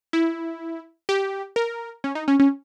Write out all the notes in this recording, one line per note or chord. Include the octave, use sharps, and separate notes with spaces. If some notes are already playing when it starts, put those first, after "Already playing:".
E4
G4
A#4
C#4
D#4
C#4
C#4